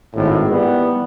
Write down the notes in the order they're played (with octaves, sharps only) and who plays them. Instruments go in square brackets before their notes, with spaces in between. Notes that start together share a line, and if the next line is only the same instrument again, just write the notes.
[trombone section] G#1 A2
E3 G3 B3